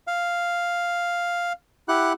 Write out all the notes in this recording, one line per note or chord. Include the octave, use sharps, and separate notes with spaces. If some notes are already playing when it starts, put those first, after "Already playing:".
F5
E4 G4 F#5 F#6